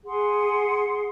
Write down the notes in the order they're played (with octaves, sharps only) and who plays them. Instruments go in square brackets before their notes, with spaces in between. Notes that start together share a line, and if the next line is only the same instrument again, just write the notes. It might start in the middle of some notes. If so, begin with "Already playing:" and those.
[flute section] G#4 F#5 C6